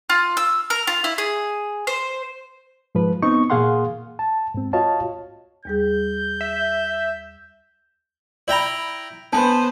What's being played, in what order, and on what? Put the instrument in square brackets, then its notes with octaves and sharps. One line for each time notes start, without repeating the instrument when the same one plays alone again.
[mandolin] F4
E6
A#4
F4
E4
G#4
C5
[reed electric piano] G#2 F3 B4
B3 C4 D#4 C#6
A#2 A#3 G#4 F5 F#5 C6
A5
G#2 C4
F4 F#4 C#5 D#5 F5 A5
[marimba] D#2 G3 G#4 [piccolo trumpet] G6
[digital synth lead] E5
[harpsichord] E4 G5 A#5 [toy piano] D5 B5
[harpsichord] B3 [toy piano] D4 G#5 A5 [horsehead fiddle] B4 C5